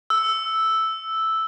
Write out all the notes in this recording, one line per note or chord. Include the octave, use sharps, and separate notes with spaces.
E6